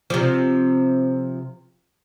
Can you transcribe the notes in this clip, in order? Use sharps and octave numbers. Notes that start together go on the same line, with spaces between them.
C3 F3